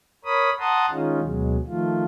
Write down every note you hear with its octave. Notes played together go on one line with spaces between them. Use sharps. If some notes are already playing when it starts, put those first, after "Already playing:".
A#4 C#5 B5 D#6
F#5 A5 A#5 C6 D#6
D#3 G#3 C#4 D#4 F4
D2 B2 F#3 G#3
D#3 F3 A3 F4